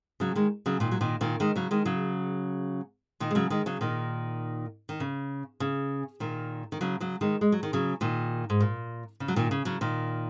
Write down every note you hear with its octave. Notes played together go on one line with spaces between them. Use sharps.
C#3 F#3
D#3 G#3
C#3 F#3
A#2 D#3
F#3
A#2 D#3
A#2 D#3
D#3 G#3
C#3 F#3
D#3 G#3
C#3 F#3
A#2 D#3
G#3
C#3 F#3
D#3 G#3
C#3 F#3
A#2 D#3
D#3
C#3
C#3
A#2 D#3
D#3
C#3 F#3
C#3 F#3
D#3 G#3
G#3
F#3
D#3
C#3 F#3
A#2 D#3
G#2
A#2
C#3
F#3
A#2 D#3
C#3
C#3 F#3
A#2 D#3